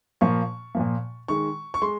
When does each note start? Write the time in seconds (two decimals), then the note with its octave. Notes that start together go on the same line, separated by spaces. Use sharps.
0.21 A#2 F3 A#3 C#6
0.75 A#2 F3 A#3
1.28 D#3 G#3 C#6
1.74 C#6
1.82 G#3 C6